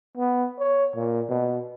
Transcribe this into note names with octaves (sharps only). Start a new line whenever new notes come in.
B3
C#5
A#2
B2